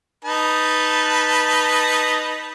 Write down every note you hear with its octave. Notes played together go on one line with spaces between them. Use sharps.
D#4 B4 A5